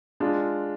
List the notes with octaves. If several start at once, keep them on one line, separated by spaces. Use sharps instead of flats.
G#3 D4 F4